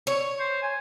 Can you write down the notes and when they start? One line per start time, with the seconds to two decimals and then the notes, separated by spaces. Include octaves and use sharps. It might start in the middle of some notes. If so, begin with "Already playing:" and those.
0.07 C#5
0.39 C5
0.62 G#5